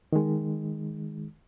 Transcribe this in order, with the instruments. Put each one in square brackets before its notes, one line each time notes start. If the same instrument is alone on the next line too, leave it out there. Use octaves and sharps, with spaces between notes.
[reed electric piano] D#3 G#3